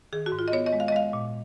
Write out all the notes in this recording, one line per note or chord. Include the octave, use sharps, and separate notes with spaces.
D#3 G#4
F#4
G#2
F4
D#5
B3 C#5
D#5
G#3
F5
D#5
G#3 F5
A#2